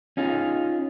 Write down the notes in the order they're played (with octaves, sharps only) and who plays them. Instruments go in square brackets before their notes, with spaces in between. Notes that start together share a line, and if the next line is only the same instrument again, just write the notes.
[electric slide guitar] C#4 D#4 F4 G#4